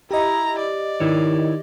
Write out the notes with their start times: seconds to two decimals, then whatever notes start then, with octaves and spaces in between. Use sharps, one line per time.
0.11 E4 G4 D#5 A#5
0.59 D5
1.00 D#3 E4 C#5